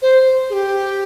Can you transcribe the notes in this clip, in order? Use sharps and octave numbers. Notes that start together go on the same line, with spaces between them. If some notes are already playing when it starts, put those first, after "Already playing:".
C5
G#4
G4